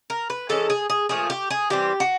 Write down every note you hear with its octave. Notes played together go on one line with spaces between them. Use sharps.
A#4
B4
E3 G#3 C#4 A4
G#4
G#4
A#2 F3 A3 G#4
G4
G#4
E3 G3 C4 G4
F#4